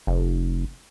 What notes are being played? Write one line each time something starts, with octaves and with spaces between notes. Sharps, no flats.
F1